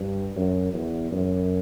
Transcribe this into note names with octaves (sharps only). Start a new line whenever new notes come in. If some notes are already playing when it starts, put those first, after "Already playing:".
Already playing: G2
F#2
E2
F#2